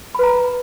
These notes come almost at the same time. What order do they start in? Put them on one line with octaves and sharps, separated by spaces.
B5 B4 A#5